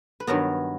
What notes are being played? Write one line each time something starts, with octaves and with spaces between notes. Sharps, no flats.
B4
G2 D#3 F#3 B3 A#4